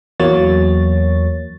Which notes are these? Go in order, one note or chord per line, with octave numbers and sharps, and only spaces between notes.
E2 F#3 A#3 C#5 A6